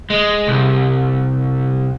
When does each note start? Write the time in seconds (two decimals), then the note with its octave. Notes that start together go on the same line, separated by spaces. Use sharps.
0.10 G#3
0.48 C2